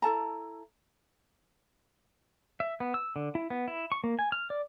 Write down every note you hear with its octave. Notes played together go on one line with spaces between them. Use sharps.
E4 A4 A5 A#5
E5
B3
E6
D3
E4
B3
E4
C#6
A#3
G#5
F6
D5